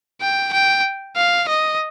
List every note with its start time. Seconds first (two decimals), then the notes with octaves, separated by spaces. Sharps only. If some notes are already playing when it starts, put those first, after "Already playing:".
0.21 G5
0.53 G5
1.16 F5
1.48 D#5